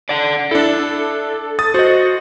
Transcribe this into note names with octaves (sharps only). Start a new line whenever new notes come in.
D5 F#5
D4 E4 A4
D#6 A6
F#4 C5 D#5